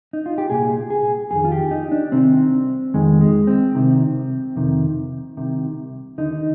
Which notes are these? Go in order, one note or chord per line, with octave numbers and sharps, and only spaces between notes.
D#4
F4
G4
C2 A#2 G#4
G#4
F2 D#3 G#4
F4
G4
D#4
D4
C2 C3 D#3 C4
F2 D#3 G#3
G#3
C4
C2 C3 D#3
F2 C3 D#3
C2 C3 D#3
D#2 D3 D#4